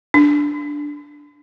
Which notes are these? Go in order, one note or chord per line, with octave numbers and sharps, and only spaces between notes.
D4